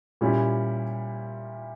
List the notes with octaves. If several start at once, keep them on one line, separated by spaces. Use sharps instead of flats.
A#2 G3 C#4 E4